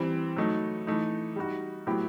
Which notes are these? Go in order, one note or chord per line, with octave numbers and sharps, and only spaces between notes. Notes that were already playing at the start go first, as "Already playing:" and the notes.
Already playing: E3 G3 C4
F#3 A3 D#4
E3 A3 D#4
G3 D#4 F#4
A2 F#3 B3 E4 G4